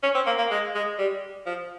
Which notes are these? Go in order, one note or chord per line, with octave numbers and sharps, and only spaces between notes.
C#4
C4
A#3
A#3
G#3
G#3
G3
F3